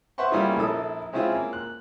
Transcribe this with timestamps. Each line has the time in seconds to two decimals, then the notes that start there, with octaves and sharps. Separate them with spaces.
0.18 B4 C5 E5 F#5 C6 C#6
0.31 G3 A#3 C#4 E4 F4 G#4
0.57 A#1 E4 A4 D#6
1.13 G#3 C4 C#4 E4 F4 G#4
1.35 A#3
1.53 F#6